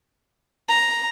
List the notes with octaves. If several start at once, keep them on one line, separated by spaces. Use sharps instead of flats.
A#5